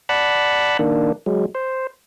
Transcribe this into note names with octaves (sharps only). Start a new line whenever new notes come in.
D5 F#5 A5 B5
D#3 A#3 D4
F#3 G#3
C5